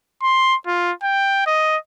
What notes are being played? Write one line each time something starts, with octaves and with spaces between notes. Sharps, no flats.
C6
F4
G5
D#5